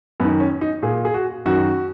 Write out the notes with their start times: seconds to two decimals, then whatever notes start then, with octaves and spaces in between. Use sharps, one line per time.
0.20 F#2 B3
0.24 D#3
0.40 C#4
0.61 D#4
0.83 A#2 G#4
1.05 G#4
1.14 F#4
1.46 F#2 D#3 F#4